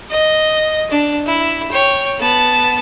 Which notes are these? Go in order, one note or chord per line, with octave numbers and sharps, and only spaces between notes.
D#5
D4
E4
C#5 G5
B3 A5